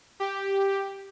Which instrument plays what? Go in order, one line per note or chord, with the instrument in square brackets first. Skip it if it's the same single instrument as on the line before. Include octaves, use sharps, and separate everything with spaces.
[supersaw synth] G4